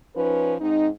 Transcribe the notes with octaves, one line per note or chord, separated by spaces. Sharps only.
F3 C#4 D#4 B4
G#2 C4 D#4